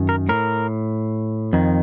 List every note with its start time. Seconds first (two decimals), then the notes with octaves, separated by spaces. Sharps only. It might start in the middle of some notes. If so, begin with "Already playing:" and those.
Already playing: F#2 D#3
0.09 A#4
0.29 A2 A#4
1.53 F2 D#3